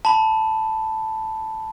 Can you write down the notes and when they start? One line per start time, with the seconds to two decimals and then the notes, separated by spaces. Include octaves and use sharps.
0.05 A5 B5